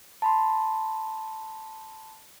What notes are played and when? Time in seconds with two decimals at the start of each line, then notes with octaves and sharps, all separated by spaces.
0.22 A5 B5 C6